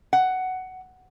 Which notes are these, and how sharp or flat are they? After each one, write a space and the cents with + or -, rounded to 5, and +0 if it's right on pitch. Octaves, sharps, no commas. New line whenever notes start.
F#5 +10